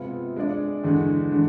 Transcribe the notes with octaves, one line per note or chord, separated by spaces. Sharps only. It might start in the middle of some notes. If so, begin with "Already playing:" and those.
Already playing: C3 G#3 B3 F4
G#3 D4 G#4 D5
E2 D3 G#3 D4
D3 G#3 D4